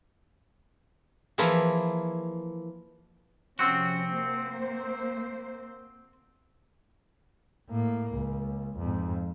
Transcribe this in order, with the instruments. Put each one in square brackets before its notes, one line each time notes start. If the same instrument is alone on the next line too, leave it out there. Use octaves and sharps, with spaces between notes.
[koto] E3 F3 A#3 E4 G#4
[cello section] C3 F3 C#4 [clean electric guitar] C4 F#4
[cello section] A#3 C5
[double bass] A2 A#3
C#2
F2 G#2